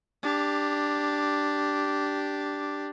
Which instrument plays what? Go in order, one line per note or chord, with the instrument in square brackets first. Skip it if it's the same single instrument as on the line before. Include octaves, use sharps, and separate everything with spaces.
[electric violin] D4 G4